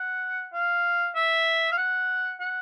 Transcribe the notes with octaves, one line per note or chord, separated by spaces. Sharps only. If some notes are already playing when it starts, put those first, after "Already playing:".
Already playing: F#5
F5
E5
F5
F#5
F#5